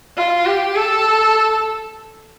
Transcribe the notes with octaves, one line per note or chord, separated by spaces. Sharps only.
F4
G4
A4